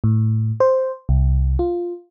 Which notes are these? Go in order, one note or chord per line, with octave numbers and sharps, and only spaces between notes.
A2
C5
C2
F4